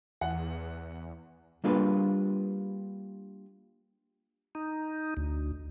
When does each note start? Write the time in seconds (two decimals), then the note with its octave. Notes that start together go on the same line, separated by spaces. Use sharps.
0.21 E2 F#5
1.64 G3 A#3 D4 F4 G#4 B4
4.55 D#4
5.17 D2